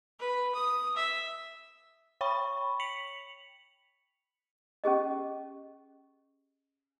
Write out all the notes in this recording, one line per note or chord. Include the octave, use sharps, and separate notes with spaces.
B4
D#6
E5
C#5 G5 B5 C#6
B6 C#7 F7 F#7
C#4 G4 G#4 D#5